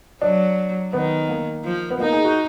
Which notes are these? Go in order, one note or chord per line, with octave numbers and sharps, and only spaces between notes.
F#3 D4
D#3 B3
A#3
F3
B3
A#3 D#4
G#4
F#4